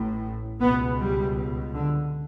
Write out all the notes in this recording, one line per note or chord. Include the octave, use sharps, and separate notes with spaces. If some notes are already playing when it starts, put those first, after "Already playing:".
Already playing: A1 A2
C#2 B2 B3
G3
D3